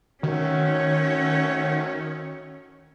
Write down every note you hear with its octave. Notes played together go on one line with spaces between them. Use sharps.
D#3 A3 C4 C#4 F#4 C#5